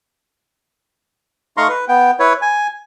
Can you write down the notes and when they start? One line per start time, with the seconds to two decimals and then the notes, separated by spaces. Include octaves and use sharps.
1.57 A3 D#4 F5 A#5 C6 C#6
1.69 B4
1.88 B3 G5
2.19 E4 B4 C#5
2.42 G#5